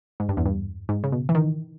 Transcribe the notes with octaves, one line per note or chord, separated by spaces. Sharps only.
G#2
G2
E2
G2
G#2
C#3
B2
E3
D#3